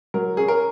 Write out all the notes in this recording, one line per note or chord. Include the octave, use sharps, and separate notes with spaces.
F#3 A#4
C#4 G#4
A#4